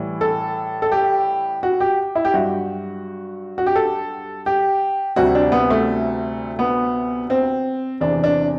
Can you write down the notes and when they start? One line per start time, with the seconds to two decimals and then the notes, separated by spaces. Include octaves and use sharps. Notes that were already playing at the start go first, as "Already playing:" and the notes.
Already playing: A2 E3 G3
0.21 A4
0.82 A4
0.92 G4
1.63 F#4
1.80 G4
2.15 E4
2.25 G4
2.33 G2 F#3 F#4
3.58 F#4
3.66 G4
3.76 A4
4.46 G4
5.16 D2 C3 G3 F#4
5.35 D4
5.52 B3
5.70 A3
6.59 B3
7.30 C4
8.01 E2 C3 E3 D4
8.24 D4